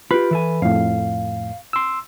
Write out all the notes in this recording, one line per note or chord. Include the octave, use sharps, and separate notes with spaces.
F4 G4 B4 B5
E3 A4 G#5
F2 A2 F5
C6 E6